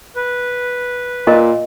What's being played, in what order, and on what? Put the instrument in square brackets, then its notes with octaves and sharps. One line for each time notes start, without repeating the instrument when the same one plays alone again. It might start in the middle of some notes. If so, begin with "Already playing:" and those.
[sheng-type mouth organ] B4
[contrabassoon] A#2 [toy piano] A#4 D#5 F5